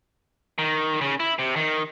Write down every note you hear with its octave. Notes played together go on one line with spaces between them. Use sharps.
D#3
C#3
E4
C3
D#3